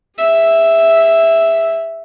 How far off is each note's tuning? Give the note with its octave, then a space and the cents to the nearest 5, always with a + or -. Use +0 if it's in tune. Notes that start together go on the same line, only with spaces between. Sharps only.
G#4 -30 E5 +0